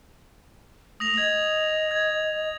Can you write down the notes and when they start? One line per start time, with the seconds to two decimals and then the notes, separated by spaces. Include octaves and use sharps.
1.00 A3 D#6 A#6 F7
1.18 D#5 G#6
1.91 G#6